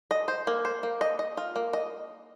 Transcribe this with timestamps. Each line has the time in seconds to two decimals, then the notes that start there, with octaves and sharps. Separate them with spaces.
0.11 D#5
0.28 C5
0.47 A#3
0.65 C5
0.83 A#3
1.01 D#5
1.19 D#5
1.37 F4
1.56 A#3
1.73 D#5